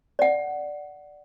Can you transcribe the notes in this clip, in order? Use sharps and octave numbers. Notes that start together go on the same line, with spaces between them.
D5 F#5